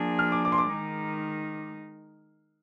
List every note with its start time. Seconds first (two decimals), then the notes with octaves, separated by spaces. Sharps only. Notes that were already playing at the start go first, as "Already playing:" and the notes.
Already playing: F3 A#3 D4 G#4
0.19 F6
0.32 D6
0.45 D6
0.52 C6
0.58 D6
0.71 D#3 G#3 D#4